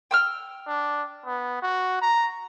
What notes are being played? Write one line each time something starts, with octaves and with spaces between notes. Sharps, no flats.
G5 E6 F6
D4
B3
F#4
A#5